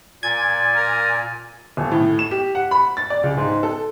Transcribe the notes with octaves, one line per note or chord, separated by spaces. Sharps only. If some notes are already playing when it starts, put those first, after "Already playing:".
A#2 D5 G#5 G#6
A#4
D#1
A2
E7
G4
F#5
B5
A6
D5
C#2
G#2
A4